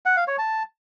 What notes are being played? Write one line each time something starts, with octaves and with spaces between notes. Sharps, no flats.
F#5
F5
C#5
A5